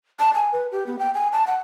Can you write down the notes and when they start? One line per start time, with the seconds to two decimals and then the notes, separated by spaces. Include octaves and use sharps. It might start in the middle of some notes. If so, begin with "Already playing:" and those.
0.19 A5
0.34 G#5
0.53 B4
0.72 G4
0.86 B3
0.99 G5
1.14 G#5
1.32 A5
1.47 F#5